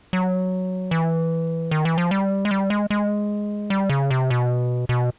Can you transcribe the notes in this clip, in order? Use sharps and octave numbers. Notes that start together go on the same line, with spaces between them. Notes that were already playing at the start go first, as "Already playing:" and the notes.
F#3
E3
D#3
E3
F3
G3
G#3
G3
G#3
G#3
G3
C#3
C3
B2
B2